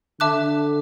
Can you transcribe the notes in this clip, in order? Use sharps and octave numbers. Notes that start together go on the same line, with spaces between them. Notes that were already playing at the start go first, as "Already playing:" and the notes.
D3 E5 A5 D6 F#6